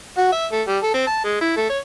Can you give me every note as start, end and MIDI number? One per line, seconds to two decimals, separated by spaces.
0.18 0.29 66
0.32 0.46 76
0.52 0.62 57
0.68 0.78 55
0.83 0.93 69
0.94 1.07 60
1.07 1.24 81
1.24 1.40 56
1.41 1.52 64
1.57 1.68 57
1.70 1.79 73